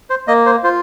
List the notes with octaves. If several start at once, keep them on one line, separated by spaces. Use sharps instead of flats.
C5
A#3 D#5
C5
F4 C5